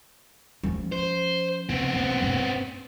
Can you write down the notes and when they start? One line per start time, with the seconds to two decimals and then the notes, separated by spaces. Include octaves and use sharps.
0.63 F3 C#4
0.92 C5
1.69 C#3 B3 C4
1.93 B1 A#3
2.22 G2 C#4